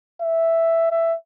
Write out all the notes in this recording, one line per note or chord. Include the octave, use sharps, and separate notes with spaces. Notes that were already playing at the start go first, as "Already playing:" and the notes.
E5
E5